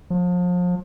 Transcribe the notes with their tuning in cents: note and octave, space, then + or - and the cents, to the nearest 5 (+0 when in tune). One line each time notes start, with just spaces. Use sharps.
F3 +35